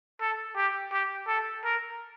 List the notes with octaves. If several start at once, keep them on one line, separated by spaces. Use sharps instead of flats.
A4
G4
G4
A4
A#4